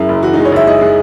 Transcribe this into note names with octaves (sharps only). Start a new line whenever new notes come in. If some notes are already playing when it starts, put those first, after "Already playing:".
Already playing: F#2 G#3 E4
F#1
E3 F#4
D#4
G#3
C#5
F#1 E5
G#3 D#5
G#3